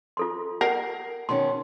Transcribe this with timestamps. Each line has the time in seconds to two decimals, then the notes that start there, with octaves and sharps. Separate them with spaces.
0.17 F4 A4 C6
0.61 A#4 F#5
1.29 B2 D#3 C#4 C6